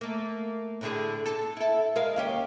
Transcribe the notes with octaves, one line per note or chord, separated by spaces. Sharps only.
A3 A#3
A2 D3 G#4
A4
E4 A4
G#3 A#4 F5
D#2 C#4 G4